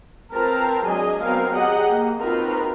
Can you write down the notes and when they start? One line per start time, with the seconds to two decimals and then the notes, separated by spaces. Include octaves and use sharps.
0.33 C4 F4 A#4 B4 A5 A#5
0.86 F#3 G#3 D4 G#4 D#5 G#5
1.23 F#3 B3 C4 A#4 F5
1.54 G4 G#4 D#5 F#5 A#5
1.88 A#3
2.20 C4 D#4 F4 F#4 A#4 B4